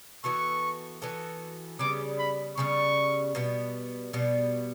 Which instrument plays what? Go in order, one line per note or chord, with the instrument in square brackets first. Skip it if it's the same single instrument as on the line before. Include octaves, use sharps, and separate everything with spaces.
[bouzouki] E3 B3 F#4 A4 [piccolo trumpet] C#6
[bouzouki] E3 B3 F#4 A4
[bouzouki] C#3 G3 B3 [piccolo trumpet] D6
[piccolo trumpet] B5
[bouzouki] C#3 G3 B3 [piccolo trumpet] C#6
[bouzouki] B2 G3 B3
B2 G3 B3